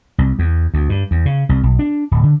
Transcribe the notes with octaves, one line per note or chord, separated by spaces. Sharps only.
C2
E2
D2
G2
E2
C#3
C2
B1
D4
D1
D3